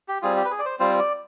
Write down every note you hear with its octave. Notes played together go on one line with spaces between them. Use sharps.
G4
G3 C4 F4 G#4
G4
B4
G#4
D5
C5
G3 C4 F4 C5
D5